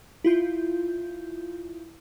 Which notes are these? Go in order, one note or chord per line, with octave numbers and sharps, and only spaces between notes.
E4 F4 G6